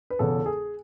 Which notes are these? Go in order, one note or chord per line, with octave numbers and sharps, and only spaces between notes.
B4
E1 E2 C#3 A4
G#4